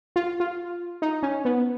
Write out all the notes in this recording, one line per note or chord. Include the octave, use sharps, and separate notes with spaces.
F4
F4
D#4
C#4
B3